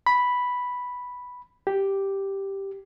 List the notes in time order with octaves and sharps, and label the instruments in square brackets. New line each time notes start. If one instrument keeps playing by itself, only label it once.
[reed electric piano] B5
G4